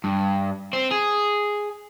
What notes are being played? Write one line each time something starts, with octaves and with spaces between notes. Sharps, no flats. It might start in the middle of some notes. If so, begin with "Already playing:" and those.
G2
C4
G#4